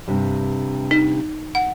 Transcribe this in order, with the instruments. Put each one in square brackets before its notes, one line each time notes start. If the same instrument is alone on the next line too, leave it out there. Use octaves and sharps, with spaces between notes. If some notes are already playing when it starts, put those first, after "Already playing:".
[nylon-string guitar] G2 C3
[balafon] D#4
F#5